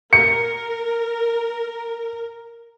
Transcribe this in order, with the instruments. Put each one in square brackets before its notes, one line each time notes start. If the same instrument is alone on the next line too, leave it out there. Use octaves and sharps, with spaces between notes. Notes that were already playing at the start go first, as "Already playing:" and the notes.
[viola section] A#4 [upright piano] C#7